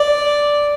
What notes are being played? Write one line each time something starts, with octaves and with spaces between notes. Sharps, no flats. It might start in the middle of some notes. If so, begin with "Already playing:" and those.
Already playing: D5